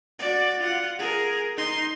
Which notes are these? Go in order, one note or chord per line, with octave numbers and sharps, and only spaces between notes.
F#4 D5
F4 F#5
G#4 A#4
D#4 C6